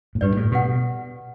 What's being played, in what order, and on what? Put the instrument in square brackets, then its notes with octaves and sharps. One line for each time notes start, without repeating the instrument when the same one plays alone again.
[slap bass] A2
[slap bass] G2 [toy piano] G4 B4 D5
[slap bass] A2
[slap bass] B2 [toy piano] G4 B4 F#5